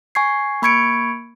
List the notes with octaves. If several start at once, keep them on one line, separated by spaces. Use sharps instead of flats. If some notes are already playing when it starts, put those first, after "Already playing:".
G#5 C#6 G#6 C7
A#3 B5 C#6 G#6 C#7 D7